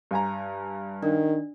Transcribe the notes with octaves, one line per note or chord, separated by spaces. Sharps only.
G2 G#5 A#5
D#3 D4